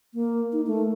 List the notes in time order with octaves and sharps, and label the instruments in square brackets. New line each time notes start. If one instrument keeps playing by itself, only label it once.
[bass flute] A#3
D#4
A3